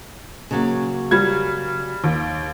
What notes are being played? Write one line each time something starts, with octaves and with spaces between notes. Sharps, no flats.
C#3 F#3 A#3
G3 G#6
D#2